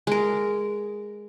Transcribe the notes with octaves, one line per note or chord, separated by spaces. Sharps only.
G#3 A#4